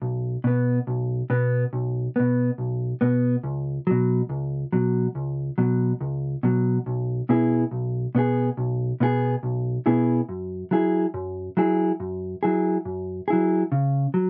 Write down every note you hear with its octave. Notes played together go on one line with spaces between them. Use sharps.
B1
B2 B3
B1
B2 B3
B1
B2 B3
B1
B2 B3
C#2
B2 F#3
C#2
B2 F#3
C#2
B2 F#3
C#2
B2 F#3
B1
B2 B3 E4 G#4
B1
B2 B3 E4 G#4
B1
B2 B3 E4 G#4
B1
B2 B3 E4 G#4
F#2
F#3 E4 G#4
F#2
F#3 E4 G#4
F#2
F#3 E4 G#4
F#2
F#3 E4 G#4
C#3
F#3